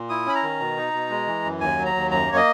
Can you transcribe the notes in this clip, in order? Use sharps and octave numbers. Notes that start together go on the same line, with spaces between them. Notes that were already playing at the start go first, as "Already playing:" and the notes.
Already playing: A#2
E4 D#6
C#4 B5
A#5
D#3
B2
D#4
B2
G#3
E3
F#2
D#2 G#5
F#3
A#5
D#2
F#2 A#5
A#3 C#5
D#5